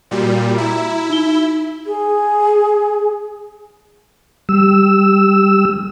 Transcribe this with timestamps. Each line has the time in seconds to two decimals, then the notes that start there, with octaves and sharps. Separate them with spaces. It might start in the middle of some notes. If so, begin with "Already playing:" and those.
0.11 A#2 G3 F#4
0.58 E4 A#5
1.10 D#4 G7
1.86 G#4
4.49 G3 E6